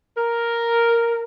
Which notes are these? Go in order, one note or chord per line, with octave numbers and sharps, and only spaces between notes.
A#4